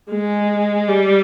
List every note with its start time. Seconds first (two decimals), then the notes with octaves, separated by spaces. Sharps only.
0.10 G#3
0.88 G3